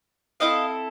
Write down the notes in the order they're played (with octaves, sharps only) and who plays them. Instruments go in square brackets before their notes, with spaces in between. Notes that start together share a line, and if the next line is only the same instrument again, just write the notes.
[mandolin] C4 E4 A4 D#5 F5